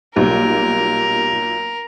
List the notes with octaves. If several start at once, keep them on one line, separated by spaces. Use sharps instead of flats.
B1 A#2 G3 D#4 G4 A#4